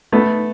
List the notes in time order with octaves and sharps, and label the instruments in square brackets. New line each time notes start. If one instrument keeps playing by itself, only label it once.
[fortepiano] A3 B3